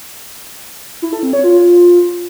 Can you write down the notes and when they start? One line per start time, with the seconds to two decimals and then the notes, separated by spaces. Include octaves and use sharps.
1.02 E4
1.13 A4
1.23 C4
1.33 C#5
1.44 F4